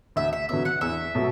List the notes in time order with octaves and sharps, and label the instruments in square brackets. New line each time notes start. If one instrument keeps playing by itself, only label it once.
[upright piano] D2 [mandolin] E5
[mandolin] E5
[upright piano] D3 F#3 B3 [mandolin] E5
[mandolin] F#5
[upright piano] E2 [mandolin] E5
[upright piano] B2 F#3 A3